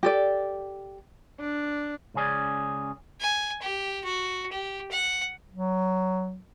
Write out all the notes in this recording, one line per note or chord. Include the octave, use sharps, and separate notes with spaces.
G4 A4 D5
D4
C#2 C#3 C#4 G#4 D5
G#5
G4
F#4
G4
F#5
F#3